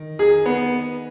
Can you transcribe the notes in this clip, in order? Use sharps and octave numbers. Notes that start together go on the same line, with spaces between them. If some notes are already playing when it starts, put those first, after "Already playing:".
Already playing: D#3
G#4
B3